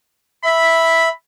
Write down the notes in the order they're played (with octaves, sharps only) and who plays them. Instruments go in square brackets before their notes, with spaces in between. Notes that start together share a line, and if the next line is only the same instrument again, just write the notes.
[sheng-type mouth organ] E5 [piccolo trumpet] B5